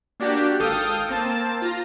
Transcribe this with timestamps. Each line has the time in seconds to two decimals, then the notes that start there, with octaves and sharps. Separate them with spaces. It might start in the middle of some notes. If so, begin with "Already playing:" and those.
0.20 A#3 D4 F#4 G4
0.59 G#1 A4 F5 G5 D#6
1.09 A#3 C4 A5
1.62 F4 A#5